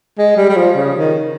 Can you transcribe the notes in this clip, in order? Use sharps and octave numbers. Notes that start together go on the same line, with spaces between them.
G#3
G3
G3
F3
C#3
D#3